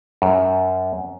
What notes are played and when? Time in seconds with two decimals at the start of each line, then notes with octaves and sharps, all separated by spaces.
0.22 F#2